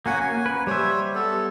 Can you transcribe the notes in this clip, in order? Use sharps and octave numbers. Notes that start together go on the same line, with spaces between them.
A#3 C#4 F#4 F#5 G#5
G#5
B4
G3 C5 C#5 E5
B3 A4